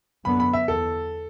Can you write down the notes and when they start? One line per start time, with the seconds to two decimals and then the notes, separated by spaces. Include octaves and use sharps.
0.25 F#2 D3 F#3 B3 B5
0.40 B5
0.53 E5
0.68 E2 A4